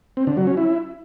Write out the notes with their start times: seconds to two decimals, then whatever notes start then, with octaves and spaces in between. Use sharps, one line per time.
0.17 C4
0.27 D3
0.37 F#3
0.47 C#4
0.57 E4